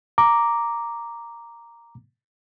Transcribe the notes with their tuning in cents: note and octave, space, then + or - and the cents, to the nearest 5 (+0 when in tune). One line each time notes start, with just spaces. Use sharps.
A#5 +0 D6 +0